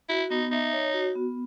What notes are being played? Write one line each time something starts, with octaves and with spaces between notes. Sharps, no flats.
E4 F#4
B3 D#4
D#4 E5
C#5
F#4
B3